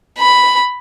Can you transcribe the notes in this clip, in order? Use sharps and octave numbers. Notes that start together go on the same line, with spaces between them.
B5